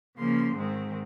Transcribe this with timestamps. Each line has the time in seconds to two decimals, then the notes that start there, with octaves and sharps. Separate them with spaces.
0.17 C#3 F3 A#3 C6
0.55 G#2 D#3 G#3 C4